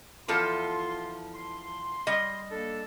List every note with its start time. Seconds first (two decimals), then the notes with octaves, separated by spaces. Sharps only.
0.28 E2 F3 F4 A4 C6
1.35 C6
2.07 G3 D#5
2.51 A#3 D4 A4